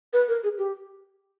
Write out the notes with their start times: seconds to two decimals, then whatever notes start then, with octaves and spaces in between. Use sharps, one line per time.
0.13 B4
0.28 A#4
0.43 G#4
0.58 G4